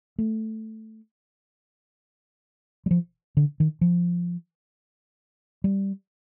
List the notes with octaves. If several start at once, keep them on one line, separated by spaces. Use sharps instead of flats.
A3
G3
F3
D3
D#3
F3
G3